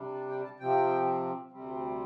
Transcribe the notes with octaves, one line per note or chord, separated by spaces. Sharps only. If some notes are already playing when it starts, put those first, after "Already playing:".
Already playing: C3 G3 D4
A5
G5
A5
C3 F3 C4 G5
D2 C3 G3 C4